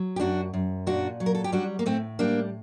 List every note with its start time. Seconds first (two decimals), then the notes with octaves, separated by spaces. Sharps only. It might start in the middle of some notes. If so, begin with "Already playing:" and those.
Already playing: F#3
0.16 G4
0.20 F#2 D4 F#4
0.54 F#2
0.87 A#2 D4 F#4
1.20 F#3
1.26 A#4
1.35 A4
1.44 G4
1.52 G3 D4 F#4
1.79 A#3
1.86 A2 A3 C4
2.19 G3 A#3 D4